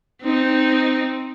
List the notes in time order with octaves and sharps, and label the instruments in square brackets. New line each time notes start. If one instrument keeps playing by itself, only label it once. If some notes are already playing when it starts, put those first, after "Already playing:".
[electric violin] C4 D#4